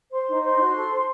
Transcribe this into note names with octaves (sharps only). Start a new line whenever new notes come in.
C5 C6
D#4
C5 C6
F#4
A4
C5